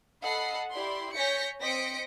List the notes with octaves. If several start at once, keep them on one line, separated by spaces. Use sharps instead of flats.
A4 D#5 F#5 B5 C7
E4 G4 D5 B5 C6
C#5 G#5 G6 A#6 B6 C#7
C4 D#5 A#6 B6 C#7 D7